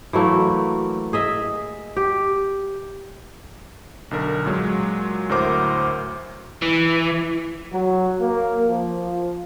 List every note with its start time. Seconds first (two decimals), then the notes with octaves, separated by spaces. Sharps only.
0.13 E3 F#3 A3 A#3
1.13 G#4 D#5 E5
1.96 G4
4.11 B1 D3 A#4
4.46 A#2 F#3 G#3
5.29 D2 A2 F#3 A#4 C5 D6
6.62 E3
7.73 F#3
8.20 A#3
8.68 F3